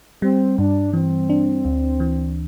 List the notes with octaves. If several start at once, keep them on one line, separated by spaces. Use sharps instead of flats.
G3 C4
G2 D4
E3 C4
D4
D2
E3